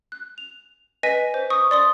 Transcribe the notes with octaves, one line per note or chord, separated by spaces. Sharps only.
F#6
F7
B4 D#5 G#5 B6 D#7
C5
C#6 D#6
D5 C6 D#6